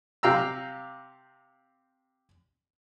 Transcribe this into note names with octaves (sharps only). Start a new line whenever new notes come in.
C3 G4 F5 A#5 E6